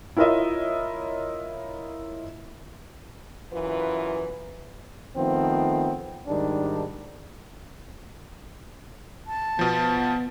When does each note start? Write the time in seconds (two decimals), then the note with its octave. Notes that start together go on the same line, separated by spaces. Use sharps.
0.17 E4 F4 A#4 C#5 D#5 E5
3.52 F#2 E3 F4 B4
5.17 D#3 F3 A3 B3 C4
6.27 G#2 D#3 G3 D4
9.27 A5
9.59 B2 F3 B3